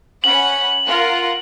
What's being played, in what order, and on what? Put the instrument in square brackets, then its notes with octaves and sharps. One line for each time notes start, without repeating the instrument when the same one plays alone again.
[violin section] C#4 F#5 B5 [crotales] F#7
[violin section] F4 A#4 F#5